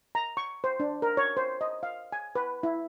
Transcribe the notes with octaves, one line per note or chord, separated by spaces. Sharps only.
A#5
C#6
C5
D4
A#4
C#5
C5
D#5
F5
G#5
B4
E4